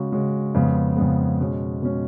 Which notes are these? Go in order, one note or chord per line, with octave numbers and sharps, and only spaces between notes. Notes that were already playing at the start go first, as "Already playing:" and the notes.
Already playing: C#3 G#3 C#4 F#4
C#3 G#3 C#4 F#4
F2 C#3 G#3 B3
F2 C#3 G#3 B3
B2 G#3 C#4
B2 G#3 C#4